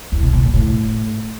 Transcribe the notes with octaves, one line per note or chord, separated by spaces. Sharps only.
E2
B2
A#2
A#2
A2